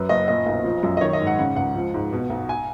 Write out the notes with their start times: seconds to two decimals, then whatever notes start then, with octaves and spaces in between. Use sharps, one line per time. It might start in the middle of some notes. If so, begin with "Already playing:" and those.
Already playing: F#2 B4
0.09 F#1 D#5
0.28 A#2 D#5
0.46 B1
0.64 F3
0.83 F#2
0.97 D#5
1.01 D#3 C#5
1.13 D#5
1.20 G#2
1.27 F#5
1.39 C#3 F#5
1.56 C#2 F#5
1.75 F3
1.94 G#2
2.13 B2
2.30 B1
2.49 G#5